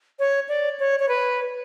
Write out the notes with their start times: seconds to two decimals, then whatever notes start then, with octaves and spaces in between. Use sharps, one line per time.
0.19 C#5
0.49 D5
0.79 C#5
1.00 C#5
1.09 B4